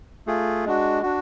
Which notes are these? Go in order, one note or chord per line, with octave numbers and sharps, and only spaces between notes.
A3 F4 G#4
G#3 D4 F#4
D4 F#4